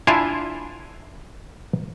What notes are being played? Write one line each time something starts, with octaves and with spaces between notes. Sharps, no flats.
D4 E4 F4 E5 F5 G#5